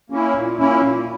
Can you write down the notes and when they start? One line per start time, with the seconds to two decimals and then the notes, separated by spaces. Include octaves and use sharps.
0.10 A#3 C#4 E4
0.34 A#2
0.58 A#3 C#4 E4
0.82 A#2